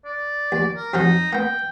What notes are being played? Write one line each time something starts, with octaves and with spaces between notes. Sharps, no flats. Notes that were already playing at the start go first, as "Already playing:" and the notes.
D5
D#2
A#4
F2 F3 F#3 D#4
A#3 B3 G5